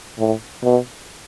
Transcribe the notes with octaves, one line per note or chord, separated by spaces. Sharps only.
A2
B2